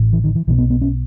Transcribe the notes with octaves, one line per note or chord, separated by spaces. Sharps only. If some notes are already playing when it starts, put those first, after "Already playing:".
Already playing: A1 A2
E3
D#3
E3
B1 B2 E3
B3
B3
C#4